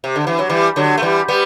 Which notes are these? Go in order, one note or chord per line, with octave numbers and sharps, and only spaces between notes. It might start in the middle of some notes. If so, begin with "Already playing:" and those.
C3
D3
E3
F#3
E3 G3
D3 F#3
A3
E3 G3
G3 B3